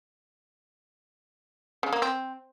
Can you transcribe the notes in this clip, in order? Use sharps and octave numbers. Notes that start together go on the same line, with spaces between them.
C#3
A#3
C4